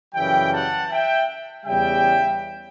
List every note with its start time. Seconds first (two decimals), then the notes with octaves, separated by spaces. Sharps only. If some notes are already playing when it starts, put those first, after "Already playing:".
0.15 F#2 C#3 E3 G3 E5 G5
0.52 F#5 A5
0.91 E5 G5
1.66 E2 C#3 G3 E5 G5